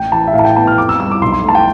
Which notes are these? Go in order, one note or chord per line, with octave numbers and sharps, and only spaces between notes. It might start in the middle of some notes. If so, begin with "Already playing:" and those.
Already playing: A1 G5
E3 A5
E5
A2 F5
A5
G5
B3 A5
F6
F2 D6
E6
G3 E6
D6
B1 C6
C6
A3 A5
G5